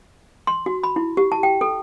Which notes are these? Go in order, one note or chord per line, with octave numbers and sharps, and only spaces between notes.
C6
F#4
B5
E4
G4
A5
G5
A4